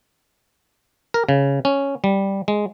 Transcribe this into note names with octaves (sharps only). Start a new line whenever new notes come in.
A#4
C#3
C#4
G3
G#3